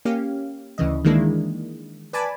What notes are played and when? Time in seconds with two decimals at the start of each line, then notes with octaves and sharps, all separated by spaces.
0.05 A#3 C#4 G4 F5
0.78 D2 C#3 E3 D#5
1.05 D#3 E3 G#3 A#3 D4 E4
2.13 B4 D5 G#5 A5 B5 D6